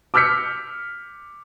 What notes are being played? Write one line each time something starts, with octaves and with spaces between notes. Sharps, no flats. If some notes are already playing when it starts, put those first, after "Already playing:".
D6 E6 F6 G6 B6 C#7